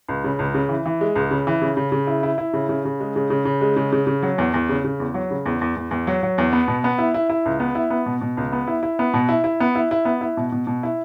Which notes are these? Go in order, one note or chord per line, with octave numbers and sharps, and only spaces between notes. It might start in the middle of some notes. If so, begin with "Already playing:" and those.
C#2
C#3
C#2
C#3
E3
E3
G#3
C#2
C#3
E3
C#3
C#3
C#3
E4
E4
E4
C#3
C#3
C#3
G#3
C#3
C#3
C#3
G#3
C#3
C#3
C#3
F#3
E2
E2
C#3
C#3
E2
F#3
C#3
E2
E2
E2
E2
F#3
F#3
E2
B3
B2
B3
E4
E4
E4
C#2
B3
E4
B3
B2
B2
C#2
B3
E4
E4
B3
B2
E4
E4
B3
E4
E4
B3
E4
B2
B2
B2
E4